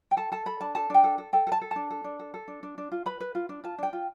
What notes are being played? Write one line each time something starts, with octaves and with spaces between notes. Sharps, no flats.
G5
A4 A5
A4 A5
A4 B5
D4 A5
A4 A5
D4 G5
A4
A4
A4 G5
A4
A5
A4
D4 A5
A4
D4
A4
A4
D4
D4
D4
F4
B4 B5
B4
F4
D4
F4 A5
D4 G5
F4